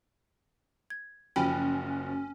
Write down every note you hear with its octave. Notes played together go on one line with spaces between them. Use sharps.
G#6
F#1 F3 C#4 F#4 G5 B5